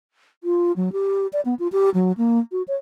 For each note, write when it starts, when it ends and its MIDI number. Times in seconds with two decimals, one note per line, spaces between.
0.44 0.72 65
0.76 0.89 54
0.93 1.27 67
1.33 1.41 74
1.45 1.54 59
1.59 1.67 65
1.72 1.90 67
1.94 2.12 54
2.17 2.39 58
2.52 2.63 66
2.68 2.75 73